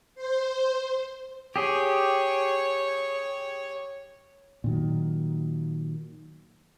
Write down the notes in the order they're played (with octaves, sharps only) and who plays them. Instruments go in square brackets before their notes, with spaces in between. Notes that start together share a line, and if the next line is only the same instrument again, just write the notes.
[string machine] C5
[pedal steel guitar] G4 G#4 [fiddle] C#5
[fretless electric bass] A#2 D#3 F#3